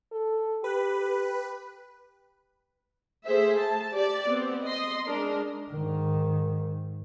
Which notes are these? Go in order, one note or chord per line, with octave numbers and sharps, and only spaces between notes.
A4
G4 B4
A3 G#4 C5 E5
A5
G4 D5
B3 C4
D#5 C6
G#3 D4 A#4
G#2 D#3